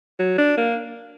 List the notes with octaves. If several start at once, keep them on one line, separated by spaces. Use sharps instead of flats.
F#3
D4
A#3